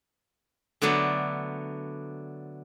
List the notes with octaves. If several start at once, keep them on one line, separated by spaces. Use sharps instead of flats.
D3 F#3 A3 B3 D4